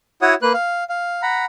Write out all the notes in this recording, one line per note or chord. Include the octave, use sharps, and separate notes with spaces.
E4 F#4 C#5 F#5 D#6
A#3 B4 F#6
F5
F5
F#5 A#5 B5